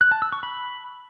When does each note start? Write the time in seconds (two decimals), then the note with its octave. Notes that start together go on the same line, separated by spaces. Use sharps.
0.01 F#6
0.11 A5
0.22 E6
0.32 C#6
0.43 B5